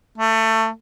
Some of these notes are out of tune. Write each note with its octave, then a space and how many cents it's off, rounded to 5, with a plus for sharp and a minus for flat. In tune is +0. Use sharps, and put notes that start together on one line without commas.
A3 +20